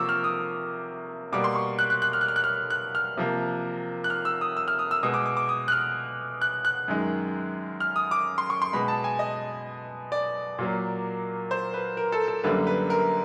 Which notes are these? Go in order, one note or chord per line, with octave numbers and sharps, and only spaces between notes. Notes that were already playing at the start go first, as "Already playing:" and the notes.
Already playing: C3 F3 A#3 C#6 D6 E6
F6
D#6
B2 G3 A#3 D6
C6
C#6
F#6
F#6
F#6
F6
F#6
F6
F#6
F6
F#6
F6
C3 F3 A#3
F#6
F6
E6
D#6
E6
F6
D#6
E6
B2 G#3 D#6
D6
D6
D6
D#6
F#6
F6
F#6
F#6
F#2 D#3 G#3
F6
D#6
D6
C6
C#6
C6
B2 G#3 B5
A5
G#5
D#5
D5
A#2 F#3 A#3
C5
B4
A#4
A4
A4
F#2 D3 G3 A#3 B4
B4
A#4